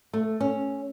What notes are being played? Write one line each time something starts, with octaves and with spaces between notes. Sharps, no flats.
A3
C#4